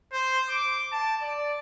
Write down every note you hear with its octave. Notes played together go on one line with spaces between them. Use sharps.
C5
D6
A5
D5